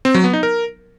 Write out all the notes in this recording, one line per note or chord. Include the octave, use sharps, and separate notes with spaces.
C4
F#3
B3
D#4
A#4